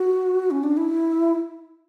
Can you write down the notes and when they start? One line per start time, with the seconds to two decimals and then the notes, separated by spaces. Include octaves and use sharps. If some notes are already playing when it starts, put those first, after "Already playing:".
Already playing: F#4
0.51 C#4
0.63 D4
0.77 E4